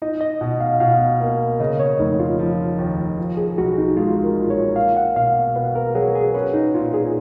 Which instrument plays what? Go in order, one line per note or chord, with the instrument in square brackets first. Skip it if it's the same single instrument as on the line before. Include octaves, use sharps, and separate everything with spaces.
[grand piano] D#4 [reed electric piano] D#5
[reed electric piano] D#5
[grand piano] B2
[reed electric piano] F5
[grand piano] B2 [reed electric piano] F5
[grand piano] A#3
[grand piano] C#3 [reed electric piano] D#5
[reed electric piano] C#5
[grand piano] F1 [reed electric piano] D#4
[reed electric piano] F4
[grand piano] F3
D#2
F3
[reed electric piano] G#4
[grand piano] B1 [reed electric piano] F#4
[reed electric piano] D#4
[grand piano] G#3 [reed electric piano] F4
[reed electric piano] A#4
[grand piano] A#2
[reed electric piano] C#5
[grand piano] A#3 [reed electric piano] F5
[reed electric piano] F#5
[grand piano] B2 [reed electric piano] F5
[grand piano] B2 [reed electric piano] B4
[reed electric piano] A#4
[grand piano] F#3 [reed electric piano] G#4
[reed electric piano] G#4
[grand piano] C#4 [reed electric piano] B4
[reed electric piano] D#4
[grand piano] A#2 [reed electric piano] F4
[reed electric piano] G#4